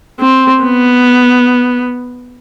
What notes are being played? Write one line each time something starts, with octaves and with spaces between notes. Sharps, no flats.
C4
B3